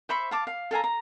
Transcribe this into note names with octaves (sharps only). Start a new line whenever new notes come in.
C5 E5 B5 C#6
F5 A5 D6
F5
A4 F5 G#5 A#5
A#5